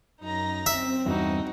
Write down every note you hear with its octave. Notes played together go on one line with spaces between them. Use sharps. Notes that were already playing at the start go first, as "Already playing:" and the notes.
F#2 D#4 A#5 A#6
C4 E5
E2 G2 D#4 F#4